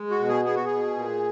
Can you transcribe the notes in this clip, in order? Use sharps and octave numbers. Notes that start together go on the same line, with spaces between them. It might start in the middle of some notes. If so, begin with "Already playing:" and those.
Already playing: G#3
F#4
B2
G#4
B3 G#4
F#4
G#4
B2
A#2